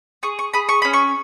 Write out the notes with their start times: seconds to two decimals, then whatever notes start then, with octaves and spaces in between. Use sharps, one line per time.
0.23 G#4 C#6
0.39 C#6
0.54 G#4 B5
0.69 C#6
0.82 C#4 B5
0.93 C#6